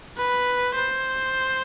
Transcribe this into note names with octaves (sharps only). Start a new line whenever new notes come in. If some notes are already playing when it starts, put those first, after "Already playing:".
B4
C5